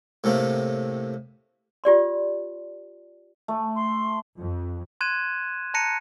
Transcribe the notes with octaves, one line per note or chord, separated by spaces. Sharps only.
A2 C3 A3 A#3
F4 G4 D5 C6
A3
C6
F2
C6 F#6 G#6 D#7 E7
A5 A#5 F#6 A#6 C#7 D#7